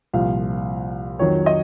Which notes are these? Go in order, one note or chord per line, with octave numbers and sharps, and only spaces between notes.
C2 A#2 F3 F5
F2 D#3 F#3 C#5
D#5